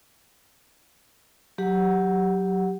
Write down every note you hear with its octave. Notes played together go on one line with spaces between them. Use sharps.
F#3 G4 F#5